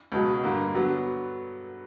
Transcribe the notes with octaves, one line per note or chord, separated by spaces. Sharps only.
C#2 B2 F#3
G2 D3 A#3
D3 F#3 B3